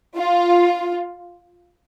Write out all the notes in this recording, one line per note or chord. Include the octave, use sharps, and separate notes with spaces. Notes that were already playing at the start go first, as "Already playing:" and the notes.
F4